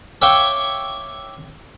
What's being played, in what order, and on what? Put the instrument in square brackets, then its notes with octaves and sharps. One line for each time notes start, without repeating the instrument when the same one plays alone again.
[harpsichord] C#5 E5 F5 G5 C#6 D6